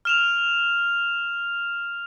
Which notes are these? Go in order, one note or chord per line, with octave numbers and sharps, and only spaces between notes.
F6 E7 F7